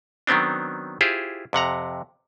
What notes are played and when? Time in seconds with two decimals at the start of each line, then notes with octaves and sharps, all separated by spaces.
0.27 D#3 F#3 B3 C4 D4
1.01 E4 F4 G4 G#4 C5
1.53 F2 C3 F#5 A#5